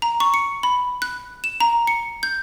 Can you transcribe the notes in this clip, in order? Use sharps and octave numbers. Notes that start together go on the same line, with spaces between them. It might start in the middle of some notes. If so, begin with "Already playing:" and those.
A#5
C#6
C#7
B5
F#6
E7
A#5
C#7
G6